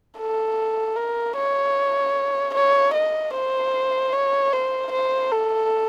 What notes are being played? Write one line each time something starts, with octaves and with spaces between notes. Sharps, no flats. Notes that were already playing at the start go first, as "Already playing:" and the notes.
A4
A#4
C#5
C#5
D#5
C5
C#5
C5
C5
A4